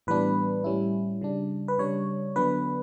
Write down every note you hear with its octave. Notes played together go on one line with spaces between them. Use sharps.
A2 E3 G3 B3 D4 B4
A2 G3 C#4 E4
C#3 G3 D4
B4
C#3 G3 D4 C#5
D3 F#3 B3 D4 B4